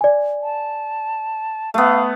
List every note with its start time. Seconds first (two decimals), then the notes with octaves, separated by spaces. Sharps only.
0.01 D5 G#5
0.43 A5
1.74 A3 B3 F5